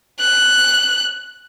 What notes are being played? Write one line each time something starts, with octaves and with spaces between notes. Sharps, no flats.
F#6